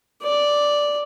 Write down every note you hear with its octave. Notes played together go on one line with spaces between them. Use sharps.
D5